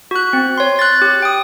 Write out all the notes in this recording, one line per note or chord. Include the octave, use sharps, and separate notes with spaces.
F#4 F#6
C4
C#5 C6
F#6 A6
G4
G5 D#6